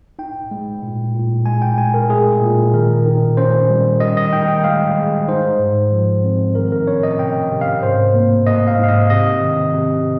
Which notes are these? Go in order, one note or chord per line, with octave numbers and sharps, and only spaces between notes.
D#4 G5
G#3
A#2
A#2
G#3 G#5
G5
G#3 G#5
A#4
G#3 G#4
A#2
D#3 A#4
D#3
C#4 C5
G3
D#3 D#5
D#5
D#3 G5
G5
G#3 F5
G#3
D#4 C5
G#2
F3
C4
D#3 A#4
A#4
C#4 C#5
D#5
C3 G5
C3
F5
G#2 C5
A#3
A#3 D#5
F5
G#2 F5
D#5
C3 D#5
D#3
C3